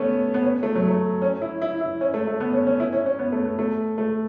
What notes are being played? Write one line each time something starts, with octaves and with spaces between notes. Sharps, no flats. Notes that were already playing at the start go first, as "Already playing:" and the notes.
Already playing: A3 B3 C#4
B3
C#4
A3
F#3
A3
C#4
E4
E4
E4
C#4
A3
A3
B3
C#4
C#4
E4
C#4
C#4
B3
A3
B3
A3
A3